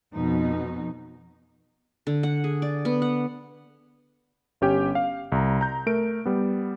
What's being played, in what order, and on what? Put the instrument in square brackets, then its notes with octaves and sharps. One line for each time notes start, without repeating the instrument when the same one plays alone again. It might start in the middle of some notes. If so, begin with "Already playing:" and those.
[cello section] F2 B2 D#4
[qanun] D3
F#5
G#4
D5
B3
F#5
[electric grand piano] G1 C#4 G4 G5
F5
C2 A#5
A#5 G6
A3 A#4 D7
G3 B3